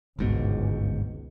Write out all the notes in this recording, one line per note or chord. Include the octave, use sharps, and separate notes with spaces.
G1 C#2 G#2 B2